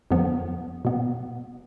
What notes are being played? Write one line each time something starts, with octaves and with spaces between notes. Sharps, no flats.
F2 D3 F3 B3
B2 B3